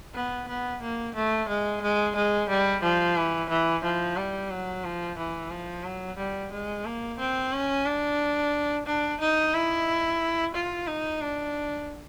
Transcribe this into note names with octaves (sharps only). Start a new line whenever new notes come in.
B3
B3
A#3
A3
G#3
G#3
G#3
G3
F3
E3
E3
F3
G3
F#3
F3
E3
F3
F#3
G3
G#3
A#3
C4
C#4
D4
D4
D#4
E4
F4
D#4
D4